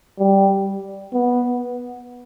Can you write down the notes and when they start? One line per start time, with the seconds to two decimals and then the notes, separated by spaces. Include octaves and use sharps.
0.19 G3
1.13 B3